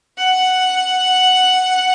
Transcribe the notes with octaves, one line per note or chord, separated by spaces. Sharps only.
F#5